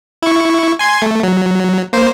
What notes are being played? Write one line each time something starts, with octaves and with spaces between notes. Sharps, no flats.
E4 C#6
G#5 C6 G#6
A3
F#3
A#3 C5